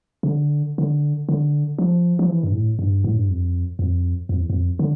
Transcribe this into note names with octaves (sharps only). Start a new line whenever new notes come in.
C#3
D3
D3
D3
F3
F3
E3
G2
A2
G2
A2
G2
F2
F2
F2
E2
F2
D3